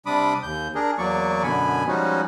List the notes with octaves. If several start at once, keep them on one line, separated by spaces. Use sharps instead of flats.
C3 G3 D4 B5 D6 D#6
D#2 G6
D4 G#4 A#4
E2 F#3 A#3 D5 C#6
F#2 B2 D3 G#5 B5
F3 G3 G#3 C#4 D#4 F#4